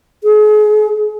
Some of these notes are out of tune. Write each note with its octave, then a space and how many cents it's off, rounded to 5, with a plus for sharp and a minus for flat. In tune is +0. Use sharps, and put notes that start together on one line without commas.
G#4 +35